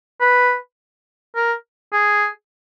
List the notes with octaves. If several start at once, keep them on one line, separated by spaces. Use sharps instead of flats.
B4
A#4
G#4